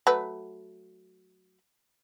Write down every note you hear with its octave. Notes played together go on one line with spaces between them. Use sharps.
F#3 A3 B4